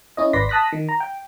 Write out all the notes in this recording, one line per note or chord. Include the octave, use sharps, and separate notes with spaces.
C#4 E4 C#5 D#5
G#1 B4 D5 C6 A#6 B6
A5 D#6 F#6 A#6 B6
D#3
A#5
G5